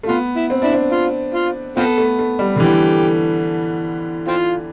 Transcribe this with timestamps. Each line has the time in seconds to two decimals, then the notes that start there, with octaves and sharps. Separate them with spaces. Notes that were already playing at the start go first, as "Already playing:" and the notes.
0.03 A3
0.08 B3 F4
0.36 E4
0.50 C4
0.62 D4 E4
0.73 C4
0.92 F4
1.35 F4
1.77 B3 C4 F4 A4
1.98 A3
2.19 A3
2.39 G3
2.56 D3
2.60 E3 G4
4.28 C4 F4